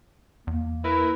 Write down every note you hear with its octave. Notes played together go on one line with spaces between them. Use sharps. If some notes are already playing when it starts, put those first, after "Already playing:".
E2 A#3
E4 A#4 B4